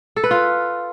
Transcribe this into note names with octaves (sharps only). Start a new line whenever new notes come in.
A4
B4
F4